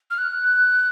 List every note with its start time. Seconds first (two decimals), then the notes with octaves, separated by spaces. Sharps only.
0.10 F6
0.18 F#6